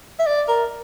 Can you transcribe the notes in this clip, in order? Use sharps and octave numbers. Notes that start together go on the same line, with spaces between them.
E5
D5
A#4